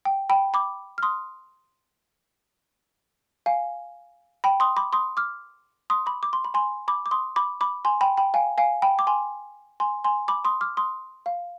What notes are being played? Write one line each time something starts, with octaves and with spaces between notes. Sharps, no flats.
G5
G5 B5
B5 D6
F6
C6 D#6
F5 G#5
G5 B5
C6 D#6
B5 D6
C6 D#6
D6 F6
C6 D#6
B5 D6
D6
C6
B5
G#5 C6
B5 D6
D6
C6 D#6
B5 D6
B5 D6
G#5 C6
G5 B5
G5 B5
F5 G#5
F5 G#5
G5 B5
D6
G#5 C6
G#5 C6
G#5 C6
B5 D6
C6 D#6
D6 F6
C6 D#6
F5